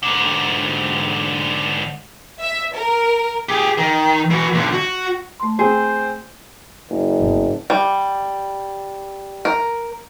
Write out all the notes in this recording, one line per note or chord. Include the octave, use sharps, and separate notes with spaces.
G#2 D3
E5
A#4
G4 G#4
D#3
E3 F#4
B1 D3
F#4
A3 C6
C4 G#4 C5
F#1
G1
G3
A#4